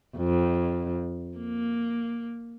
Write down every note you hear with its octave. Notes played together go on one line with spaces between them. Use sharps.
F2
A#3